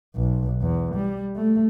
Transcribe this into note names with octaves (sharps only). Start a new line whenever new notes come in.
B1
E2
G3
A3